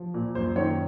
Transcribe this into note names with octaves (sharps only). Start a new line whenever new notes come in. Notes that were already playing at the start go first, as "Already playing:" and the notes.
Already playing: F3
A#2
F#2 C5
D#3 C#5